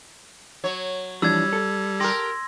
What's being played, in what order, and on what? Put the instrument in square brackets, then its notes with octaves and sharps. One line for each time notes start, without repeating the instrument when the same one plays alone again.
[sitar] F#3 C#5
[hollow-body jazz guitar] E3 F3 D4 [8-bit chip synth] G3 [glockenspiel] E6 G#6
[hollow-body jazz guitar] A4
[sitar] G4 A#4 [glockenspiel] C6 A#6